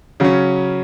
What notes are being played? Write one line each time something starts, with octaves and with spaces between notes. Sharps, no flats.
C#3 F#3 C#4